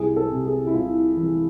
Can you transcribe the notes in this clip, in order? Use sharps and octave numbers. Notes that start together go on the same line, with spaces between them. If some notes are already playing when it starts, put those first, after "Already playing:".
Already playing: C2 G#4
A4
C3
G#4
E4
C2 F4
E3